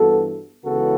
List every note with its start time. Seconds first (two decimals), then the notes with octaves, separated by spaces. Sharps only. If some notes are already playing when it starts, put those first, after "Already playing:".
Already playing: G2 E3 B3 F#4 A4
0.65 C#2 C#3 E3 B3 F#4 A4